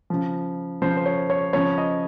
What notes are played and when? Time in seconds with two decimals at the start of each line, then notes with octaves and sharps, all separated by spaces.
0.10 C#3 F3
0.82 C#3 F3 C5
0.97 C5
1.06 C#5
1.30 C#5
1.53 C#3 F3 C#5
1.78 D#5